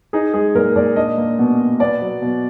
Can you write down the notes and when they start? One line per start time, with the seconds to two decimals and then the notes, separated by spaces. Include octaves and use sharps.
0.13 D#4 G#4
0.34 G#3 G#4
0.55 A#2 A#4
0.76 A#2 D5
0.96 D4 D#5
1.17 A#3
1.39 B2
1.59 B2
1.80 B3 D5
2.02 F#3
2.22 B2